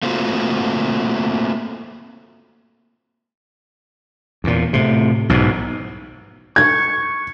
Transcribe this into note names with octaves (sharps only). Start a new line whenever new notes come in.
A3 A#3 C4 F4 F#4
E2 A#2
A2 C3
B1 G#2 B2
C#6 G#6